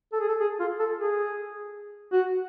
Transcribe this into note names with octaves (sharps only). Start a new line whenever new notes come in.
A4
G#4
A4
G#4
F4
A4
G#4
F#4